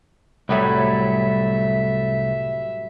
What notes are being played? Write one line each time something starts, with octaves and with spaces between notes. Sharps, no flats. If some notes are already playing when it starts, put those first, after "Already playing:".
C2 A2 F#3 G3 A3 E5